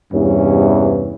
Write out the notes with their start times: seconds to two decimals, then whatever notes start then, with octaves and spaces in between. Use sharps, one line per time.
0.13 E2 G2 C3 E3 C#4